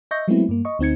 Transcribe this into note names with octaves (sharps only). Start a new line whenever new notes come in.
D#5 E5 C#6 G6 A#6
F#3 G#3 A3 B3 C4 E4
G2 A#3
D#5 C#6
D2 C4 D#4 G#6 C#7